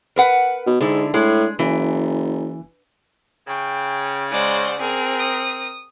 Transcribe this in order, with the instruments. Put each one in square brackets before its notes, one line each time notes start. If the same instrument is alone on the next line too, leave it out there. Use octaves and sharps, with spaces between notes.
[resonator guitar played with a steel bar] A#4 B4 F#5
[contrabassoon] B2
[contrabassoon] G#2 [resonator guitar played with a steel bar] D3 E4
[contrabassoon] A2 [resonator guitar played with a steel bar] G#3 G#4
[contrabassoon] F#1 [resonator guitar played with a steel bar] E3
[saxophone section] C#3 [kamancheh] G5
[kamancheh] G#3 D5 [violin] C5 F#5
[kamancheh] C4 A#4 [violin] G#4
[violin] D#6